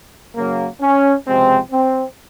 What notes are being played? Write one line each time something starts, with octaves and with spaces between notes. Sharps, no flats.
F#2 C#3 F#3 A#3
C#4
C#2 C3 F3 G#3 C4
C4